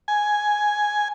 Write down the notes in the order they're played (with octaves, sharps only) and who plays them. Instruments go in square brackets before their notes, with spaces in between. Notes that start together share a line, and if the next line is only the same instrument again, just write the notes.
[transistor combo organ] G#5